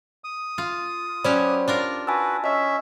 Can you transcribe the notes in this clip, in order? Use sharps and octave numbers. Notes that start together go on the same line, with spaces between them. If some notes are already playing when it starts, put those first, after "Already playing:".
D#6
F4
F#3 C#4 G4 C5 D5 B5
D4 F4 A#4
F#4 B4 G#5 A5 E6
C#4 D#5 E5 E6